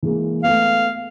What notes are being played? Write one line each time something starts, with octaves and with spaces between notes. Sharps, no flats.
E3 G#3 A#3
A3 B3 F5